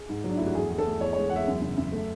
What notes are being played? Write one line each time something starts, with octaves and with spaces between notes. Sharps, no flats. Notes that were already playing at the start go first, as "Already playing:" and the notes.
Already playing: G#4
G#2
F#3
D4
A3 E4
F#4
E2 G#4
E2
A4
A3
E2 C#5
G#3 C#5
F#5
E2 E5
F#2
C#3
F#2
A3